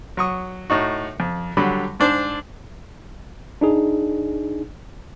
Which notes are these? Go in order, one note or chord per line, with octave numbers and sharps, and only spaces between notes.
F#3 C#6 D#6
A2 D#4 F#4
F2
D3 F#3 G3 B5
G#2 D4 C5 A5
D4 D#4 G#4